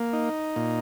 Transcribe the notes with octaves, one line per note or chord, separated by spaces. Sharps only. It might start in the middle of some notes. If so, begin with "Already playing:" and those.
Already playing: A#3
D#4
A#2